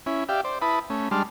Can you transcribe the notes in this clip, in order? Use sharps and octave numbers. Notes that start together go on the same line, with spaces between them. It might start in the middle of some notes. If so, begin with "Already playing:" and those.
C#4 E4
G4 D5 E5 F5 G5
C5 D5
E4 B4 A5 B5 D#6
A3 C#4
G3 G#3 D4 A5 C6 F6